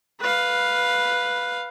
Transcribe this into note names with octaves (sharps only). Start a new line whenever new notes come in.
B4 F5